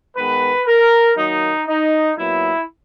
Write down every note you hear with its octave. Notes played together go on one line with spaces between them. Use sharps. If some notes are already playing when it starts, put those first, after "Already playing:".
D#3 G#3 B3 B4
A#4
D#3 F#3 A#3 D#4
D#4
A#2 F#3 B3 E4